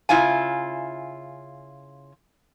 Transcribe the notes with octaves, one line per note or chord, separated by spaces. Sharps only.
C#3 E4 F4 G#5